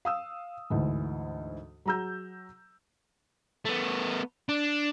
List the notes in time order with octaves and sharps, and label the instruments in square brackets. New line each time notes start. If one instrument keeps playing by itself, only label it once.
[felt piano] F5 D#6 E6
D2 G#2 E3
F#3 G#4 A#5 E6 G6
[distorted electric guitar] A3 B3
D4